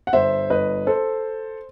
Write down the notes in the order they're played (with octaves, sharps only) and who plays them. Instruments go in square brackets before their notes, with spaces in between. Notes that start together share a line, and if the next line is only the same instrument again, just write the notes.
[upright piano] F#5
G1 C5 E5
G1 B4 D#5
A4 C5